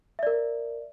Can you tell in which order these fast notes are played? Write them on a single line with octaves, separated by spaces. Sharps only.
E5 D5 A#4